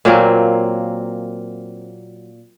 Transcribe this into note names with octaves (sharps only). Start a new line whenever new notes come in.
A#2 F#3 A#3 C4